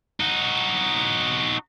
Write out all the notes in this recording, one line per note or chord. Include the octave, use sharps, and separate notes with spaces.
D#4 F#4